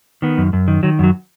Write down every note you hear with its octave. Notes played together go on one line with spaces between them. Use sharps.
D#3 B3
F#2
F#2
D#3
D#3 F#3
F#2 F#3